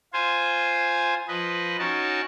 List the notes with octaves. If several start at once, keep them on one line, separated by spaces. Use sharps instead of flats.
F4 C5 G#5
F3 B4 D#5
C#4 D#4 F#4 A#4 A5